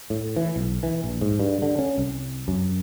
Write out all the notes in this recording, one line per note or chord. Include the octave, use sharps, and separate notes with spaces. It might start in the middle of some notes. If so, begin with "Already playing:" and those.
A2
E3
B1
E3
A#1
G#2
G2
D3
C#4
C2
F#2